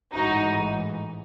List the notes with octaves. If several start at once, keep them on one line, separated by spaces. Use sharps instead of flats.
A1 G#2 E3 D#4 F#4